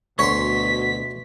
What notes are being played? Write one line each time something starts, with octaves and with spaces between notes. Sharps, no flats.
D2 B2 C#5 C6 B6